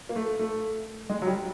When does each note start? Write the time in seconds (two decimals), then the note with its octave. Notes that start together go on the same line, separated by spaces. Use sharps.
0.09 A#3
0.16 A3
0.39 A3
1.10 G#3
1.22 F#3
1.27 G3